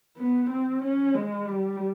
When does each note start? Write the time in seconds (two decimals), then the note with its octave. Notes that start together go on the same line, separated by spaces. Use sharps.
0.17 B3
0.50 C4
0.83 C#4
1.14 G#3
1.47 G3